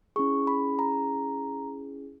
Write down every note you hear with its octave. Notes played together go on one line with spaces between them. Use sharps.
C#4 E4 G#4 C#6
B5
A#5